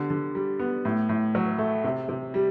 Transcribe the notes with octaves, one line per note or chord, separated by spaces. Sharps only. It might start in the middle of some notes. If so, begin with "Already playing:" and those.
Already playing: D3 G3 B3
D3
G3
B3
A2
A2
F#3
A3
C3
C3
G3